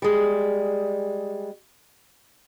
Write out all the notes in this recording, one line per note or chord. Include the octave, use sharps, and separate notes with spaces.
G3 G#3